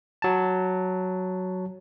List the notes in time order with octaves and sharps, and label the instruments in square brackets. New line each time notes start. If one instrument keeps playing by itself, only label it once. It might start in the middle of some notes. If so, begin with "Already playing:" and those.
[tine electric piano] F#3 A5